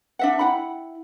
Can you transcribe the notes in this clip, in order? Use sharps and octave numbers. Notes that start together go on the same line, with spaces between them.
D4 E5 F#5
E4 F#5 G5 B5